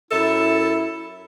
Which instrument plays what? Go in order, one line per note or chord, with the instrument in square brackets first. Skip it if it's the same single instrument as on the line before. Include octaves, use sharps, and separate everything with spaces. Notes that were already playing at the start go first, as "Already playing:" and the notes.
[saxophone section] F#2 A4 E5 [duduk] E4